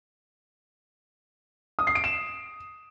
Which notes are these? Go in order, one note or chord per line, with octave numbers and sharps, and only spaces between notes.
D#6
C7
D7
E7